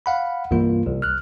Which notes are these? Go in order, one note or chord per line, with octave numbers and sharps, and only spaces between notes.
F5 F#5 B5
C2 G2 E3 A#3 F4
C2
F6 F#6